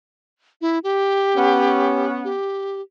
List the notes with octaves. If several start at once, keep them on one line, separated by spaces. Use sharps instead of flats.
E4
G4
B3 C#4
G4